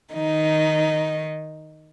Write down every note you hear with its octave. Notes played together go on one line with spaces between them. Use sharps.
D#3 D#4